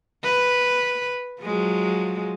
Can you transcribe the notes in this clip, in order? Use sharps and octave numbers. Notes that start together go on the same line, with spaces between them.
B4
F3 F#3 G#3